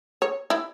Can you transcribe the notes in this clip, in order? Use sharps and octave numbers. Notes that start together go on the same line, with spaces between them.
C#5
E4